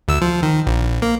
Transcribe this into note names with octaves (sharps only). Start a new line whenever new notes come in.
D2 E6
F3
D#3
A#1
A#3